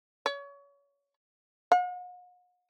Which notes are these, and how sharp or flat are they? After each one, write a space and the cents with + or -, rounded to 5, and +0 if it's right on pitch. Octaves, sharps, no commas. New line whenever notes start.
C#5 +30
F#5 -45